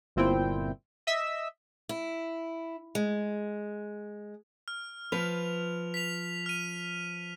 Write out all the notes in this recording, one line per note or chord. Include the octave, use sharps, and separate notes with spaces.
G1 A#2 C4 E4 G5
D#5 E5 E6 B6
E4
G#3
F6
F3 B4 F7
B6 F7
F6 D#7